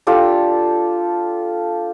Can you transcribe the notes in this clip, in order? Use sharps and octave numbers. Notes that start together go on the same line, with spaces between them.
D4 F4 G4 A4